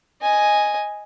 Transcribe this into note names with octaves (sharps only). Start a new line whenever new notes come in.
D#5 G#5